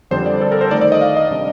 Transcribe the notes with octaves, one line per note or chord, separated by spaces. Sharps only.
F2 D3 G3 D4 C5
D5
A4
A#4
C5
D#3 A3 D#4 D5
D5
D#5
F5
D#5
C3 G3 D4